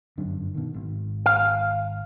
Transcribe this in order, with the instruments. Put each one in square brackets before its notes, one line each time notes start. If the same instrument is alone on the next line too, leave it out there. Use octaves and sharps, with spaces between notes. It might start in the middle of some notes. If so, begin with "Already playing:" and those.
[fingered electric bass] G1 F#2 D4
B2 D#3
G#1
[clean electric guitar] F5